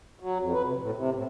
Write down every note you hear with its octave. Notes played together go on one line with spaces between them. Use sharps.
F#3
F2
B4
C3
A2
C3
A2